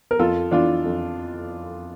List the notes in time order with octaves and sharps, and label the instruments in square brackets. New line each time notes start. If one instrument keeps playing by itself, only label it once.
[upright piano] A#4
F2 F4 A4
E3 D4 F4
F2